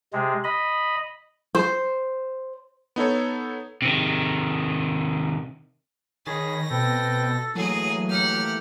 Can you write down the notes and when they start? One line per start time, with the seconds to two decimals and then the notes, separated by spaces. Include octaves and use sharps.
0.13 C3 G#3
0.44 D#5 B5
1.55 C5
2.96 B3 D#4 A4 C#5
3.82 C3 D#3
6.27 D#3 G#4 C#5 B5 A#6
6.71 B2 C4 A4 B4 G5
7.55 E3 F#3 A3 A#3 G#4 D#5
8.10 G4 F#5 F6